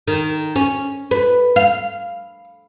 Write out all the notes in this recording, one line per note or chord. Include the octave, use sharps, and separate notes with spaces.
D#3
C#4
B4
F5